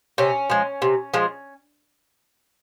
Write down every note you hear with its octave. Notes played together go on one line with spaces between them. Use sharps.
C3 C#4
F3 G#3
C3
F3 G#3